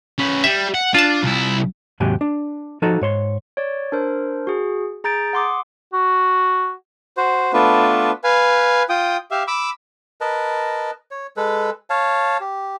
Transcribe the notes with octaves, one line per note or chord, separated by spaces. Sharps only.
C#4 B4
G3 E5
F#5
D4 F4 A5
C2 E4
D#2 G#2 C3 F#3 G4 G#5
D4
F3 D#4 F#4 A4 A#5
G#2 C#5 C6
C#5 D5
D4 A#4 C5
F#4 G#4
G#4 A#5 G6 A6 D7
F#5 C6 D6 D#6
F#4
F#4 C5
A3 B3 D4 F4 B4
B4 F5 G#5
F4 G5 D#6
G4 E5 F5
B5 D6 E6
A#4 B4 D#5 A5
C#5
G#3 A4 B4
C#5 F5 A5
G4